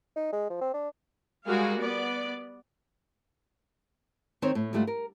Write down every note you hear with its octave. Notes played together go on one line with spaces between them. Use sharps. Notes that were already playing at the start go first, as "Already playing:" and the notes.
D#4
G#3
F3
C4
D4
G3 G#3 F#4 G#4 A#4 F5
B3 D5
D#3 C4 D#4 C5 C#5
A2
D2 G#2 G3 A3 F4 F#5
A#4